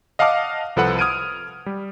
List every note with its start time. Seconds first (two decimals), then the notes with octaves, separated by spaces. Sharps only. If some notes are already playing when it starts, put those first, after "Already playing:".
0.19 D#5 F5 F#5 A5 D6 F6
0.76 C2 F3 A4 B4 F#5 B5
0.99 D#6 F6 G#6 D7 D#7
1.66 G3